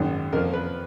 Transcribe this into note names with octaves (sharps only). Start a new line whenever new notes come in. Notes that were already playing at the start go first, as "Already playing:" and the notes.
Already playing: G#1 F#2 D#3
F2 F3 A#4
B4